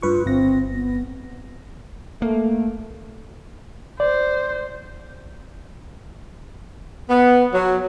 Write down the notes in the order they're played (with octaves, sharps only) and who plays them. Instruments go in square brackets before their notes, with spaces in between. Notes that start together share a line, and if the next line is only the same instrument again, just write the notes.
[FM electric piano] G2 B4 C#6 [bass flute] F4
[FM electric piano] G1 G2 A#6 [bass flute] C4
[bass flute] B3
[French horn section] A3 [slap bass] A#3
[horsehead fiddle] C5 [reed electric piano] D5
[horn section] B3
F#3